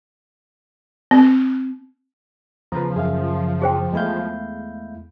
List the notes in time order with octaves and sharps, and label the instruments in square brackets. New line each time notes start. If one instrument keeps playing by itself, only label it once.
[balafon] C4
[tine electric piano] E2 C#3 [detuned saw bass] F3 [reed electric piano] B4 A#5
[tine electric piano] F#2 C#3 [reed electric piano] G#4 E5 F5
[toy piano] G#4 C5 G5
[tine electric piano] E2 E4 G6 [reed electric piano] G#3 A3 F5